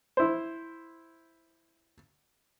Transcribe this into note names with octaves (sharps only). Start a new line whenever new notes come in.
E4 C5